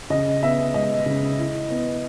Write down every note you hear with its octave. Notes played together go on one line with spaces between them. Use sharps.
C#3 D#5
B3 E5
G#3 D#5
C#3
E4
B3